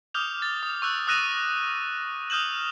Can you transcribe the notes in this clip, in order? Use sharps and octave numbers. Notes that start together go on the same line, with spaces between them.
D6 D#6 F6 G6 F7
A6
D#6
C#6 E6 F#6
D#6 E6 F#6 A#6 D#7 E7
D#6 F6 G6 E7 F#7